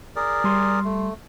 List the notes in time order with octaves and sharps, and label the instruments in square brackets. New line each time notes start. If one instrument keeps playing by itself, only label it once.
[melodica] G#4 A#4 D5
[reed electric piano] G3 C6
[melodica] A3